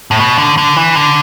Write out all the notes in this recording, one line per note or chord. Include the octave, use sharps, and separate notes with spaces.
A2
B2
D3
D3
E3
D3